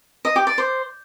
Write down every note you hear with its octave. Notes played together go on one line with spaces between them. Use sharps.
D#5
G4
D5
C5